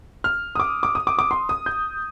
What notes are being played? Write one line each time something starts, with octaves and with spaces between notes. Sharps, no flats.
F6
D#6
D6
D6
D#6
D6
D6
C6
D#6
G6